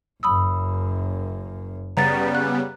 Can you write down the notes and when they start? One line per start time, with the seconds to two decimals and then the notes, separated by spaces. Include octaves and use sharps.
0.23 F#1 F#2 B5 D#6 E6
1.97 C#3 G3 B3 A#5 A6
2.35 F#6